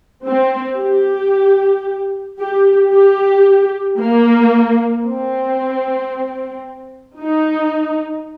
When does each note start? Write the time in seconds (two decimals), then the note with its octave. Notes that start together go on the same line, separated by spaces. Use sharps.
0.24 C4
0.78 G4
2.38 G4
2.91 G4
3.98 A#3
5.05 C4
7.19 D#4